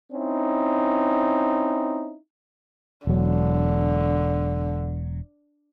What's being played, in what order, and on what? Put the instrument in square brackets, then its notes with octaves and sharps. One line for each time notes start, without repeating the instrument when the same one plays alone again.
[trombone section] C4 C#4 D#4 E4
[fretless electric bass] E1 F#3 [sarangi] D3